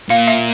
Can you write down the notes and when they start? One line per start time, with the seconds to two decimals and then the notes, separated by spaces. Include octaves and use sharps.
0.09 A#2 F5
0.27 E5